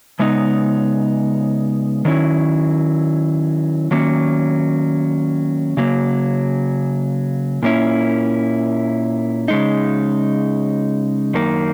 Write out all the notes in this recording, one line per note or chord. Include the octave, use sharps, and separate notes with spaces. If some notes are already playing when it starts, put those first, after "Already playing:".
C#3 G#3 B3 D#4
D#3 F#3 C#4 E4
D#3 F#3 A#3 C#4
C#3 F#3 A#3
A#2 A#3 C#4 E4
C#3 G#3 D#4
F#2 D#3 A#3